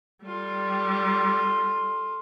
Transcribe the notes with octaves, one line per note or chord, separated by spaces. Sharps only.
G3 F4 A4